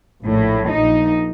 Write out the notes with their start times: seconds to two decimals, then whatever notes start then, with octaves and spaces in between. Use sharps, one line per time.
0.23 A#1 A2
0.68 A#1 D#4